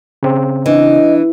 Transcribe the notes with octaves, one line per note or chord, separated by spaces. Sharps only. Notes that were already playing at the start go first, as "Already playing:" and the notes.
C#3 C4
E3 D4 D#5